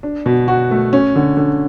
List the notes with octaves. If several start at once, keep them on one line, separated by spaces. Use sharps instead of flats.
D4
B2
F#4
A3
C#4
D3
D3